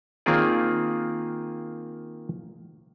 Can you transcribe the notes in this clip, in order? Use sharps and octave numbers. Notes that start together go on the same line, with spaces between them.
D#3 A#3 C4 F4 G#4 D5